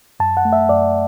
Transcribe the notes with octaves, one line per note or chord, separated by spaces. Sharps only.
F#2 A5
F#5
A3
E5
F#2 D5